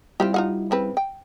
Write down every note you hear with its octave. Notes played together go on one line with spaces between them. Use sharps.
G3 C4 E4 F4 G4
D#4 F4 F#5
C#3 C4 B4
G5